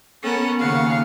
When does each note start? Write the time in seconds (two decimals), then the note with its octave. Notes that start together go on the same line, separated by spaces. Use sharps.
0.23 B3 C#4 A4 A#4 F#5
0.59 D#2 C#3 F5 F#5 C#6